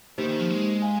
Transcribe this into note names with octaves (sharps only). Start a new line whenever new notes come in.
D#3 A#3 D#4 G4 C5
D#3
F3
G#3
F5 G#5